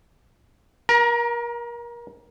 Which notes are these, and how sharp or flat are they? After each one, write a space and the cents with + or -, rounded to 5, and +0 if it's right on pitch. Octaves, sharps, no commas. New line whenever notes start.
A#4 +30 A#5 +0